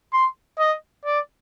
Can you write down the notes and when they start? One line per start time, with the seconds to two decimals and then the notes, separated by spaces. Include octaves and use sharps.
0.13 C6
0.59 D#5
1.05 D5